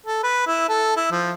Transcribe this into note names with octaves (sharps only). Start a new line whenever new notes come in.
A4
B4
E4
A4
E4
F3